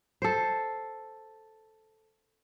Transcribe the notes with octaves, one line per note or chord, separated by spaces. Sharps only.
A4 C5